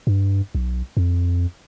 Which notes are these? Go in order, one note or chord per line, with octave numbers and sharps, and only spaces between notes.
G2
B1
F2